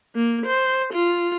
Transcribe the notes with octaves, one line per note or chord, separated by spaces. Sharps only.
A#3
C5
F4